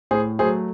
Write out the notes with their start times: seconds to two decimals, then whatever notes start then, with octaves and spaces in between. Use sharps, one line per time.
0.11 A2 G#4 C5
0.39 F#3 A3 G#4 C5